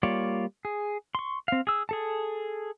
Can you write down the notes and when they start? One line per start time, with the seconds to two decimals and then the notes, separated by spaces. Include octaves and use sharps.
0.03 G3 A#3 F4 C#5 D5
0.65 G#4
1.15 C6 C#6
1.48 C4 F5
1.67 G#4 E6
1.89 G#4 A4 A5